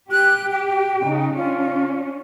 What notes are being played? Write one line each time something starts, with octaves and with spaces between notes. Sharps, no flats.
G4 F#6
G5
C#3 D#4
C#4 D4 F4